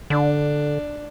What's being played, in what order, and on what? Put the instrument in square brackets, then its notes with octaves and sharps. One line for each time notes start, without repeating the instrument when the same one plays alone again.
[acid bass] D3 [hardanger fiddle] D4